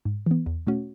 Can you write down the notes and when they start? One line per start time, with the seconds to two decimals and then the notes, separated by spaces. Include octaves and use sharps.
0.05 G#2
0.26 E3 B3
0.46 E2
0.67 B2 A3 C#4 F#4